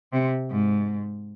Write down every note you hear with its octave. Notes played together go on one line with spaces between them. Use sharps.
C3
G#2